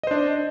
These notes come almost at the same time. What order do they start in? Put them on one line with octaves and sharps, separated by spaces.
D#5 C5 D4